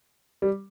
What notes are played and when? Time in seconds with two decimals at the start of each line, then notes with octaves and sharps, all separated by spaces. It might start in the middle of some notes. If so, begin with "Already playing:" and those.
0.42 G3